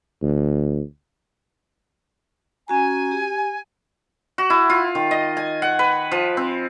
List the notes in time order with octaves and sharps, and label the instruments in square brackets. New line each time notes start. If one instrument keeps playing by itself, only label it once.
[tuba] D2
[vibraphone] C#4 F#4 A#5 [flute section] G#5
[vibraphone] G4
[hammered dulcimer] F#4
E4
F4
D#3
D#5
G#5
F#5
B4
F3
C4